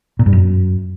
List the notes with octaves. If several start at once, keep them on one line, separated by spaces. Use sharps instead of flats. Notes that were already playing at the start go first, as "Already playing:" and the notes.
A#2
G2
F#2